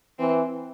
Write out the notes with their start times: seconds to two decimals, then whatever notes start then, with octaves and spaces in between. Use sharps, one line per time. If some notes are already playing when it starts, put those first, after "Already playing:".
0.19 E3 C4